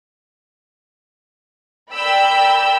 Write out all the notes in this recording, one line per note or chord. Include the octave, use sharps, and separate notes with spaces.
A#4 D5 G5 B5 E6